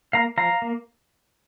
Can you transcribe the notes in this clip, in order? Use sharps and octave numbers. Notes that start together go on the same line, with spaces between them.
A#3 F5 A#5
F3 F5 A#5
A#3